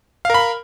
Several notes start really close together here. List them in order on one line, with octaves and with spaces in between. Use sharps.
F5 A#4 B5